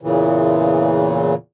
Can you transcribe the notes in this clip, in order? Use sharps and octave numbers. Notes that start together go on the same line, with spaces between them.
E2 A#2 C#3 E3